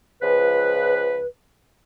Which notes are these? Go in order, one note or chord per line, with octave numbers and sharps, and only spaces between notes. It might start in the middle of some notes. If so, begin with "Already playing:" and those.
C#2 F3 B4